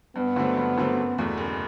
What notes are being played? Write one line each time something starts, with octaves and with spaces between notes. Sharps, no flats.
G2 B3
D3 F#3 A3 C4
G2
D3 F#3 A3 C4
F#1
E2 B2 A3
F#1